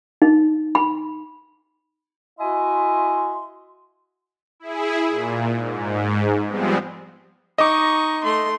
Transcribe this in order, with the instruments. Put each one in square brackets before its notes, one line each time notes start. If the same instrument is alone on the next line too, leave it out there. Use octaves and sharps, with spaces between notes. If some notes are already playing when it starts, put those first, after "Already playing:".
[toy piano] D#4
B5
[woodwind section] E4 F#4 D#5 E5 G#5 C6
[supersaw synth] E4 G#4
A#2
G#2
F3 G3 G#3 B3 C4
[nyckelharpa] D#4 C#6 [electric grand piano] D#5 D6
[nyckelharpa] A3 C6